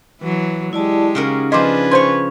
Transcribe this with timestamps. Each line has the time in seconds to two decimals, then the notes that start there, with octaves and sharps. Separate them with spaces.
0.22 E3 F#3
0.73 G#3 E4 G4 D5 A5
1.15 C#3 D#4 F#4 A#4
1.52 F3 D4 G#4 B4 D#5 C6 D6
1.91 C5 C#5 G#5 C6